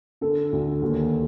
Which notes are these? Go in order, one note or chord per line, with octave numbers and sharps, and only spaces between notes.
D3 A4
D2
D#2